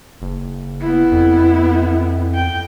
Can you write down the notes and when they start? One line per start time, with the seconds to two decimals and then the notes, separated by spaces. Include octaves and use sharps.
0.22 F#1
0.81 B3 E4
1.12 F2
2.35 G5